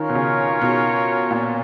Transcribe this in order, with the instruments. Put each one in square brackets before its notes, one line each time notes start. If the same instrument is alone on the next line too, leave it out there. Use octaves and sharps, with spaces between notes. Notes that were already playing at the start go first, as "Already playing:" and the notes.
Already playing: [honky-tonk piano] D#3 [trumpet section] C#4 F4 A#4 C#5
[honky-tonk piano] B2
C#3
B2
A#2